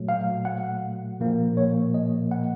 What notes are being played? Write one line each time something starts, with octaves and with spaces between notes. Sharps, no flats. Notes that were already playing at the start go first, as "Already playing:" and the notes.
Already playing: A#2 F#3 A3
F5
F#5
A#2 F3 A#3
C#5
D#5
F#5